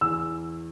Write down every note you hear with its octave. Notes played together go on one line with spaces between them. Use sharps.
E2 E6